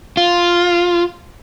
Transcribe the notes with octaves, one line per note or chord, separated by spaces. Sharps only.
F4